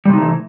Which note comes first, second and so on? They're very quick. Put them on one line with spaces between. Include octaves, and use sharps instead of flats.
G3 C3 D#4 A3 E3